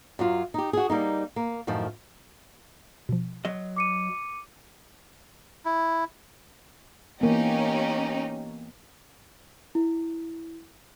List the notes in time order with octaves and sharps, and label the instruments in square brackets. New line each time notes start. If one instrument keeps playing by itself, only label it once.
[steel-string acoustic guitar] F#2 F#3 F4
D#4 G4
F#4 G#4
G3 A#3 D#4
A#3
F#2 A2 D#3 F3
[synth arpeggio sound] B2 F3
[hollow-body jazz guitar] F#3 D#5
[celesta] D6 C#7 D#7
[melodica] E4
[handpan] E3 A#3 B3 [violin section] C#4 D#4 G4
[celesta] E4